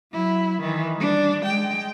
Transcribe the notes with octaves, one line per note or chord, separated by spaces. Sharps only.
F#3 E4
D#3 E3
G3 D4
G#3 G5